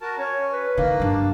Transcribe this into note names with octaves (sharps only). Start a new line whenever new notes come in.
F#4 A#4 A5
C#4 C#5
B4
D#3 A#3
G2 F#3 D4